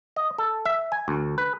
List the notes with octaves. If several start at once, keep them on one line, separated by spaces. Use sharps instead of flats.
D#5
A4
E5
G#5
D2
B4